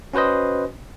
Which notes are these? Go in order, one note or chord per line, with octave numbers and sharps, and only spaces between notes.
C#4 F#4 B4 C5 D#5